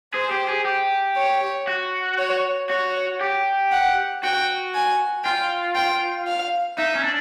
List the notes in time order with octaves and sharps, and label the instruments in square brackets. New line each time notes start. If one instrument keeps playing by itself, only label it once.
[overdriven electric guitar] G#4 [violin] C5
[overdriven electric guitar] G4
G#4
G4
[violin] C#5
[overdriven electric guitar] F#4
[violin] C#5
[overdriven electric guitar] F#4 [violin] C#5
[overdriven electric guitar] G4
[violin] F#5
[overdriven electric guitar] F#4 [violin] G5
[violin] G#5
[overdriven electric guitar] F4 [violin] G5
[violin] G5
F5
[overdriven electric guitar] D#4 [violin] E5
[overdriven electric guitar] C#4
D4